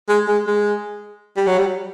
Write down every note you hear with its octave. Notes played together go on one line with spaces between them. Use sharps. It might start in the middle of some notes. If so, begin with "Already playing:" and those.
G#3
G#3
G#3
G3
F#3
G3